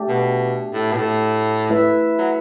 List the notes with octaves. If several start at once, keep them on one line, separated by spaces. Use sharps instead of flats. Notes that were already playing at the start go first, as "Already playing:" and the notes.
Already playing: A3 D4 G4
B2
A2
B2
A2
A3 E4 B4 E5
F#3